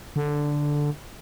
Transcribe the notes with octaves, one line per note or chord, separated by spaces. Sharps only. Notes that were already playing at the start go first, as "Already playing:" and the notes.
D3